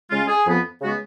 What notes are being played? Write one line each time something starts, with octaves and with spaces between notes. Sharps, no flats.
C#3 G#3 C#4 F4
G#4
F2 F3 B3
C#3 G#3 B3 F#4